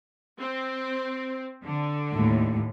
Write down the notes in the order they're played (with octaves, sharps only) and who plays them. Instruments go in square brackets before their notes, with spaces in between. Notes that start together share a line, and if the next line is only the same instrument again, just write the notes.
[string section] C4
D3
[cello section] D#2 A2